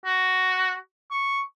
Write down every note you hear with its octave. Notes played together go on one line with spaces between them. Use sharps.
F#4
C#6